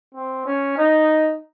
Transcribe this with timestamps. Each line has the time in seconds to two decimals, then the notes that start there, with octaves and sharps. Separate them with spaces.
0.14 C4
0.46 C#4
0.78 D#4